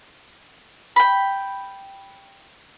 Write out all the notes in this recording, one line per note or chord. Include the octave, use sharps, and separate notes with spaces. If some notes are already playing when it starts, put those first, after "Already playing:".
G5 B5